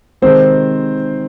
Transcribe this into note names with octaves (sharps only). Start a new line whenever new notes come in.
C3 D#3 G#3 C4 C5